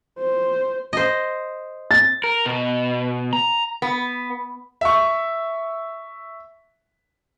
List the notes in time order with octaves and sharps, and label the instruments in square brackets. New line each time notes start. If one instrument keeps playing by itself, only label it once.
[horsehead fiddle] C5
[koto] C5 D#5
[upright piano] A6
[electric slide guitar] A#4
B2
A#5
[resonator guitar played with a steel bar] B3
[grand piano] E5 C#6